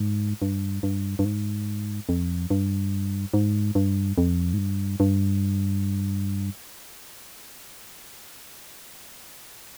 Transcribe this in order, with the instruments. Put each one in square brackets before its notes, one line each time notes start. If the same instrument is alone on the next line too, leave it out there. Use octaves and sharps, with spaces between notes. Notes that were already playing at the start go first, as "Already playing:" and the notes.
Already playing: [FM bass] G#2
G2
G2
G2
G#2
F2
G2
G#2
G2
F2
G#2
G2
G2